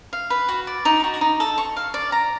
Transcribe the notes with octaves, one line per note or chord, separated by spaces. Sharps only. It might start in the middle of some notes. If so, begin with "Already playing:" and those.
F5
B4
F#4
D5
D#4
F#4
D#4
A4
C#6
F5
D5
A#5